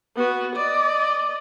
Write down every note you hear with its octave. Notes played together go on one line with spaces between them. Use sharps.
B3 F#4
D5 D#5